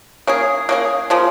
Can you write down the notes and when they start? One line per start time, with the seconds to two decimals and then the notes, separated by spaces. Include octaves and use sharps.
0.27 A#3 C#4 G#4
0.69 A#3 C#4 G#4
1.10 C#3 F3 A#3